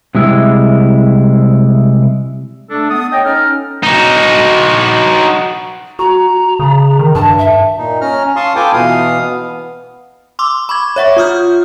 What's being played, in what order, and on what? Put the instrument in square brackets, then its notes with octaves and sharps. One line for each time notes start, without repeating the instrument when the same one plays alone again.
[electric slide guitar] C3 G3 G#3 E4
[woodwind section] A3 D4 A4
B3 D#6
C#5 D#5 G5
C#4 D#4 A4 A#5 F6
[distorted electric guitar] D#4 F#4
[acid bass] F#4 [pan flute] A#5
[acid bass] C#3
D#3
[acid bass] G2 [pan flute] A5
[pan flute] E5
[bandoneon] A#2 D#4
C#4 A#5 F6
F5 A5 C6 C#6 D#6
F4 A4 B4 G5 G#5 D6
B2 E3 F5 D#6
B3
[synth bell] C6 D6 E6
B5 C#6 D6 G#6
C#5 E5 F#5 C#6
F4 D#6 F6 G6